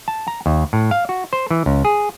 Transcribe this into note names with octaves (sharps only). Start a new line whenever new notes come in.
A5
A#5
D#2
A2
F5
F#4
C5
E3
C#2
G#4